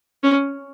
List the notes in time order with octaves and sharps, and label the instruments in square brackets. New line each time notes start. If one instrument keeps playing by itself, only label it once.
[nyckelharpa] C#4